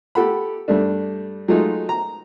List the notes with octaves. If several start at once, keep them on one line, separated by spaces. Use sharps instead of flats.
G4 A4 F#5 B5
G2 G3 A3 D4
F#3 G#3 A3 D#4 F4
A#5